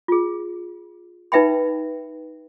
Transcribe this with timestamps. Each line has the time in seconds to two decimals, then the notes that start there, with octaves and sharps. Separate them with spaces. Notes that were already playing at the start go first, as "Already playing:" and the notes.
0.08 F4 G#4
1.32 D#4 B4 E5 G5 B5